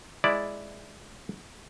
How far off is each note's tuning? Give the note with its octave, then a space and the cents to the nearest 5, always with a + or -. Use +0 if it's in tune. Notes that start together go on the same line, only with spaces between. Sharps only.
G#3 +0 E4 +0 D5 +0